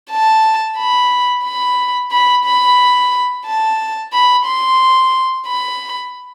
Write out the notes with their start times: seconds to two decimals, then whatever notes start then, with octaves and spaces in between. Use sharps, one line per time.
0.11 A5
0.77 B5
1.45 B5
2.11 B5
2.45 B5
3.46 A5
4.13 B5
4.46 C6
5.47 B5